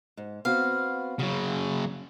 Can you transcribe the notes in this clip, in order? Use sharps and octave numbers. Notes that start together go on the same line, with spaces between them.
G#2
B3 C4 F#4 F5
C#3 F#3 F#4